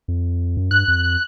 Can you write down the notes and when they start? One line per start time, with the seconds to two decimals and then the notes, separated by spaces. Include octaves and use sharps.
0.08 F2
0.57 F#2
0.71 G2 F#6
0.88 F2